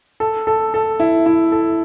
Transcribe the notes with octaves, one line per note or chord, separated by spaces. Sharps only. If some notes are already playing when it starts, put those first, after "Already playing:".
A4
A4
A4
E4
E4
A4